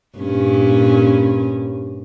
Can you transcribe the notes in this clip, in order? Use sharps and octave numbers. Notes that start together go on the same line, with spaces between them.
G2 A#2 C#4